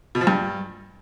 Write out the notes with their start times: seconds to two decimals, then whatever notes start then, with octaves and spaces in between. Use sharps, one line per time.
0.15 B2
0.21 F3
0.27 G2